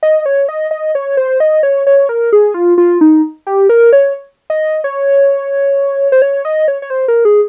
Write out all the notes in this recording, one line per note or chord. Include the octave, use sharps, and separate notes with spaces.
D#5
C#5
D#5
D#5
C#5
C5
D#5
C#5
C#5
A#4
G#4
F4
F4
D#4
G4
A#4
C#5
D#5
C#5
C5
C#5
D#5
C#5
C#5
C5
A#4
G#4